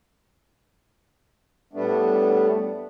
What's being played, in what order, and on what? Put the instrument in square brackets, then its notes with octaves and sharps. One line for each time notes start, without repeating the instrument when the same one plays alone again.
[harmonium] A2 G3 A3 B3 D4